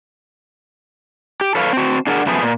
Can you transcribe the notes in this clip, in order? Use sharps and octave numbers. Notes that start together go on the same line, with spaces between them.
G4
A4 B4 C#5 F5
C4 F#4
D4 G#4 A#4 D5 F#5
F#2 F3 A3 B3 D4 G#4
A#2